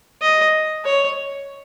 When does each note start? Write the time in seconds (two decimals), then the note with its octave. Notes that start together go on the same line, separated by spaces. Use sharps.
0.21 D#5
0.84 C#5